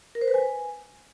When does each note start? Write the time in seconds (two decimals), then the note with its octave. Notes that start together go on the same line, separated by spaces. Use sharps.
0.15 A#4
0.21 C5
0.28 B4
0.34 G#5